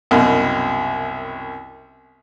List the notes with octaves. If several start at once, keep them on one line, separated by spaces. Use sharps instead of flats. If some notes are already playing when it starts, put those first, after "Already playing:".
C2 F#2 B2